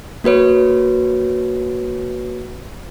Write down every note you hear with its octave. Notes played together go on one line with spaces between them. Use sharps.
A#3 F#4 B4 C#5